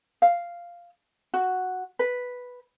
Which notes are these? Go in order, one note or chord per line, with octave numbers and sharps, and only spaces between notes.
F5
F#4
B4